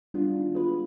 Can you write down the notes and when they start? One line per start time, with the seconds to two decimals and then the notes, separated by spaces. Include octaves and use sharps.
0.14 G3 B3 D4 F4
0.34 D#3
0.55 G#3 B3 F4 B4